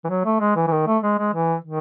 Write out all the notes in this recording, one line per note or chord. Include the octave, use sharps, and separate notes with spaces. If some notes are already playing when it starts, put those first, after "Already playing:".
E3
F#3
A3
G#3
E3
E3
D#3
A3
G#3
G#3
E3
D#3